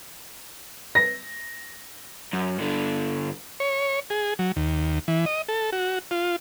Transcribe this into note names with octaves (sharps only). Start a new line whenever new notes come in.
A#6
F#2
G2 D3
C#5
G#4
F#3
D#2
E3
D#5
A4
F#4
F4